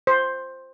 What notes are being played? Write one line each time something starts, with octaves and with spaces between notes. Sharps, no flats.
C5